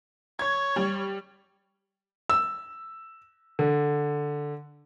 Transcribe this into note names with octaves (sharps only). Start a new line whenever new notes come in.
C#5 G#6
G3
E6
D3